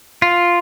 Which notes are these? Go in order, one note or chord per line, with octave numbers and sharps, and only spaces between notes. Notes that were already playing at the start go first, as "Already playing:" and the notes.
F4